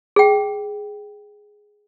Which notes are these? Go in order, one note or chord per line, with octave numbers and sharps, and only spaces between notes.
G#4 G5